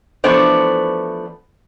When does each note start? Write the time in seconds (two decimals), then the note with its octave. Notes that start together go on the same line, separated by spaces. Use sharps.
0.24 E3 F3 A3 B3 D4 C5